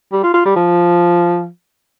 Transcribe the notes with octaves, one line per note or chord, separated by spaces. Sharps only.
G3
F4
F4
G3
F3